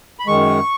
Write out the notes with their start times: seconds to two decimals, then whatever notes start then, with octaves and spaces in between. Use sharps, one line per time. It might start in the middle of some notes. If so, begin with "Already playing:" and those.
0.19 B5
0.27 F#2 D#3 G#3 C#6